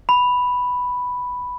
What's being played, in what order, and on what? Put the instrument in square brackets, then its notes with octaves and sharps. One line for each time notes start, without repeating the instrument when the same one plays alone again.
[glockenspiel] B5